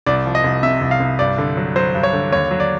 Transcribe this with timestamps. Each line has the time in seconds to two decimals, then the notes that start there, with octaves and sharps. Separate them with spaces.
0.06 C2 D5
0.26 F3
0.35 D#5
0.44 C2
0.63 C3 E5
0.82 C2
0.91 F5
1.00 C2
1.19 G2 D5
1.38 D3
1.57 F#3
1.76 F#3 C5
1.95 G2
2.03 C#5
2.13 D3
2.32 D#2 C#5
2.51 F#3
2.60 D5